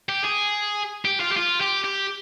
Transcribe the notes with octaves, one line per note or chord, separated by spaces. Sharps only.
G4
G#4
G4
F4
G4
F4
G4
G4